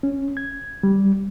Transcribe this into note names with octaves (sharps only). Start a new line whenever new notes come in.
C#4
G#6
G3